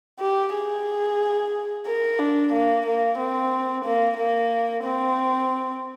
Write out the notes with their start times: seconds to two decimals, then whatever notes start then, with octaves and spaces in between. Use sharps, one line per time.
0.20 G4
0.54 G#4
1.86 A#4
2.19 D4
2.53 A#3
2.86 A#3
3.18 C4
3.85 A#3
4.17 A#3
4.84 C4